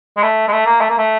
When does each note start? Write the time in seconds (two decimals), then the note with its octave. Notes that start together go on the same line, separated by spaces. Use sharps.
0.17 G#3
0.23 A3
0.48 G#3
0.52 A3
0.66 A#3
0.81 A3
0.90 A#3
0.98 A3